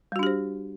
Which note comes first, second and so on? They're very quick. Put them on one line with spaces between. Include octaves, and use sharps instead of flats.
G3 F#4 D4 G4 C5